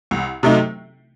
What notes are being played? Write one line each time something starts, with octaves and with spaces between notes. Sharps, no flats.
C2
C3 F#3 A3 D#4